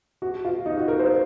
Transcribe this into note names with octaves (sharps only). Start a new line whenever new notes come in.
F#4
F4
D#4
F#4
A#4
C5